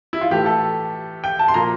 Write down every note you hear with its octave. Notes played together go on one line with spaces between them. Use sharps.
E4
F4
A2 E3 A3 G4
A4
G5
A5
C6
A#2 F3 A#3 A#5